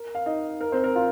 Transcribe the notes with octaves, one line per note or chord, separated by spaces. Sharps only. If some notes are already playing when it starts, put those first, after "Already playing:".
Already playing: A#4
F5
D#4 D#5
A#4
C4 C5
A#4
F4 F5